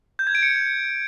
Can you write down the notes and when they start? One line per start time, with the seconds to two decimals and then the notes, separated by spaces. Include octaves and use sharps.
0.19 G6
0.27 G#6
0.35 D7
0.43 C#7